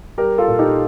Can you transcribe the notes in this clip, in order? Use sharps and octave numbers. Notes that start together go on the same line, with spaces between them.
G3 G4 A#4
F4 A4
A#2
D#4 G4